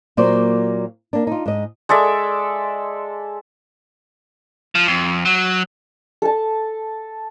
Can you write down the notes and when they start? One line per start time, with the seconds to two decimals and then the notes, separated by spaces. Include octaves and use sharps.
0.17 A#2 F#3 A#3 C5 D5
1.13 A#3 D4
1.27 D#4 F4
1.46 G#2 D#5
1.89 G#3 A4 D5 E5
4.75 F3
4.87 F2
5.25 F#3
6.22 A4 A5